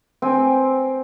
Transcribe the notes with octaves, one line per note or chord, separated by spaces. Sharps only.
C4 G5 G#5